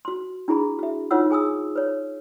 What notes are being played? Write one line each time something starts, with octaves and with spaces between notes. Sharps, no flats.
F#4 C6
D4 E4 G4 G#4 B5
F#4 E5
D#4 F4 B4 C#5 F#5 E6
G#4 G#5 D#6 E6
B4 C#5